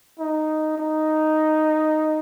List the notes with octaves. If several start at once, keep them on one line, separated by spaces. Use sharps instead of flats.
D#4
D#4